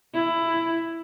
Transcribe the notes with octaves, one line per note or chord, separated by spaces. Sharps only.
E4